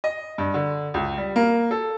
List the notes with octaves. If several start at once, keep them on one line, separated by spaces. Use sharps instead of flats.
D#5
G2
D3
C#2
G3
A#3
A4